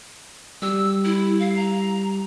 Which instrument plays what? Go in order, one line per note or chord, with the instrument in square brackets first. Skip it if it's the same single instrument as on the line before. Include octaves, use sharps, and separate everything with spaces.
[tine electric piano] G3 G4 [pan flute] E6
[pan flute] E4
F5
A#5